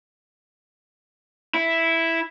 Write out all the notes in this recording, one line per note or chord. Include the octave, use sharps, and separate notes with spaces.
E4